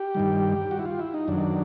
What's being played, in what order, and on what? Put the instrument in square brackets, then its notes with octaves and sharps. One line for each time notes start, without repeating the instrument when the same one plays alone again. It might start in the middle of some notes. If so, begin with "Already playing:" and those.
Already playing: [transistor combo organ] G4
G2 D#3 G3
F#4
E4
F4
E4
D#4
F#2 D#3 F#3 D4